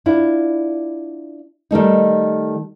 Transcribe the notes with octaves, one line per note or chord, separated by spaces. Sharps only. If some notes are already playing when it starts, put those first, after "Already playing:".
D4 E4 F4
D#3 G3 A3 D#4